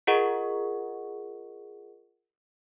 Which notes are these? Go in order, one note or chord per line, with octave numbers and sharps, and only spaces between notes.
F4 G#4 A#4 D#5 F#5 C#6